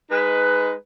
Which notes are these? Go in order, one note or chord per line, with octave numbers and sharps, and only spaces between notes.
G#3 D#4 B4